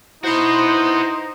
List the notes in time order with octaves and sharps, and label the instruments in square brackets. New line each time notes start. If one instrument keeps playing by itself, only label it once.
[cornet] D#4 [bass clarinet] E4 [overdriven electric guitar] F#4 B4 [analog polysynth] C5